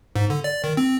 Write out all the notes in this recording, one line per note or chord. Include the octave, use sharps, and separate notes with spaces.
G#2
D3
D5
D#3
C4